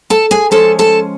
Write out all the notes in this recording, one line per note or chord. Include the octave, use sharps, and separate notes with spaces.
A4 A5
G#4 G#5
F3 G#3 C#4 A4 A5
A4 A5